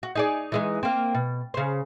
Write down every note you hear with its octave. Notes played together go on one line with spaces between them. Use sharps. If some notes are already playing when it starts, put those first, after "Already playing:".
F#4
D#4 G#4 D5
E3 G#3 D#4
A#3 C4
B2
C#3 C5